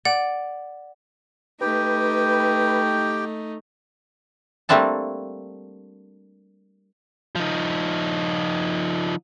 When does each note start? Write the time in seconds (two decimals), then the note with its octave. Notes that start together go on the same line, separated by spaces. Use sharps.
0.05 D5 F#5
1.61 A3 D#4 G4 B4 G5
4.69 G3 A3 A#3 C4 D4 A5
7.36 F3 D#4